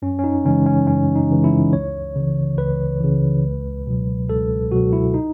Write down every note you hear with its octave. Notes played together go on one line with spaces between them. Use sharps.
F#2 C#4
C#4
D#4
C#3 E3 G#3 C#4
C#4
F#2 C#4
D#4
C#3 E3 G#3
E4
C#2 C#5
C#3 E3
C#2 B4
C#3 E3
C#2
B2 F#3
C#2 A4
B2 F#3 F#4
E4
D#4